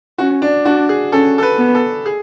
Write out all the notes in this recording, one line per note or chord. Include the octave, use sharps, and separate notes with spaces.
C#4 F#4
D4
D4 F#4
G#4
C#4 A4
A4
B4
B3
A4
G#4